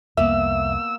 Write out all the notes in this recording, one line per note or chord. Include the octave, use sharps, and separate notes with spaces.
C2 F2 A#3 B3 E5 E6